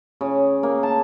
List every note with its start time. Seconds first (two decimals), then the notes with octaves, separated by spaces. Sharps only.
0.21 C#3
0.63 A#3
0.83 A5